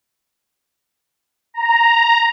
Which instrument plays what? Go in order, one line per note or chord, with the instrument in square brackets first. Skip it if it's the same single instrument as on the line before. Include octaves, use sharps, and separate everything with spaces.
[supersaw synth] A#5